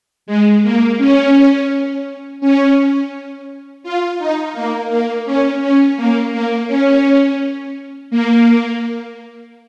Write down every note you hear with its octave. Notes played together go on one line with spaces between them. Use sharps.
G#3
A#3
C#4
C#4
F4
D#4
A#3
A#3
C#4
C#4
A#3
A#3
C#4
A#3